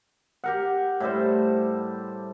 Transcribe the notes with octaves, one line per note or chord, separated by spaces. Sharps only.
G4 A#4 F#5
A2 G3 A4 C5